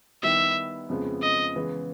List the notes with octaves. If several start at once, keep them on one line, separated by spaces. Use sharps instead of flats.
D#3 G3 B3 E4 G4 E5
F2 C#3 F3 G#3 B3
D#5
C#3 E3 G#3 B3